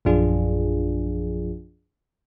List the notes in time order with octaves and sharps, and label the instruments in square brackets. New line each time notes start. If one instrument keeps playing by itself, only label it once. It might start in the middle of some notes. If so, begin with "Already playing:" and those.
[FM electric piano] A#1 F#2 F3 D4 F4 G#4